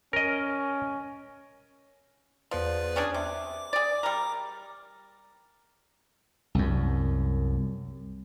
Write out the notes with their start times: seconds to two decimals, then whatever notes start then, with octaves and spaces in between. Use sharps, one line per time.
0.13 C#4 A#4 D#5
2.51 E2 F3 B4 D5
2.96 C#4 D4 G#4
3.14 C3 D6
3.73 G#4 D5
4.03 G3 A#4
6.55 C2 F#2